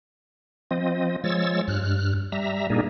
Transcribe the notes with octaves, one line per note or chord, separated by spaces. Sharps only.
F3 C4 D#5
F3 G#3 C#5 E6 A6
G2 F6 F#6
G3 E5 A#5
A#2 G3 A#3 D4 D#4 G#4